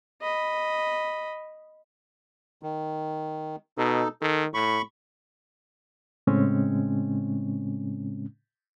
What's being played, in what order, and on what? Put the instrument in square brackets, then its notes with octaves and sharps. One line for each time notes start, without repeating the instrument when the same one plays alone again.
[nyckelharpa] D#5 B5
[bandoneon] D#3
[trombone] B2 [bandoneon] D#4 A4
[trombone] D#3 [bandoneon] A4
[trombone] A2 [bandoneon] B5 C#6
[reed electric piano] A2 C#3 G#3 C4 C#4